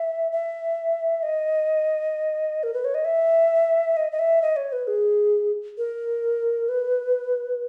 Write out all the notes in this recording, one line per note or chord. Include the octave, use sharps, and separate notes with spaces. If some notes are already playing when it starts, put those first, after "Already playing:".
Already playing: E5
E5
D#5
A#4
B4
C#5
D#5
E5
D#5
D#5
E5
D#5
C#5
B4
G#4
A#4
B4